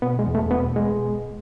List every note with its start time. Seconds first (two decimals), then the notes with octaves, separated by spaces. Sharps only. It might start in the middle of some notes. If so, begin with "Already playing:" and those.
0.02 B2 B3
0.19 G#3
0.27 E2
0.35 A3
0.51 B2 B3
0.76 G#3